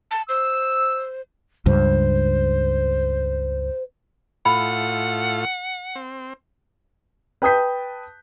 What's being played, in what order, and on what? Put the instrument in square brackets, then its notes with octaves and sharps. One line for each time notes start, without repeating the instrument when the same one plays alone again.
[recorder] A5
[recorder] C5 [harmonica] E6
[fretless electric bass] C#2 G2 [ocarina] C5
[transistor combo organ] A2 F4 [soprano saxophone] F#5 [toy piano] B5
[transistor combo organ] C4
[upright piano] B4 G5 A5 D#6 G6 B6